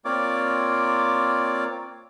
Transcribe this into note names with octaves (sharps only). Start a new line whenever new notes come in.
A#3 C4 F4 C#5 D5 D6